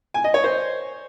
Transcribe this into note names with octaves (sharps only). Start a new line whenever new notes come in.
G#5
D#5
C#5
C5